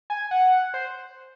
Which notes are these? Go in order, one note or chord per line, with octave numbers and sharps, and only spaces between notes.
G#5
F#5
C5